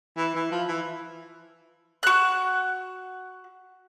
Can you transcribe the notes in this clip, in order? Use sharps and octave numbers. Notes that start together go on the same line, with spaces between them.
E3
E3
F3
E3
F#4 F#6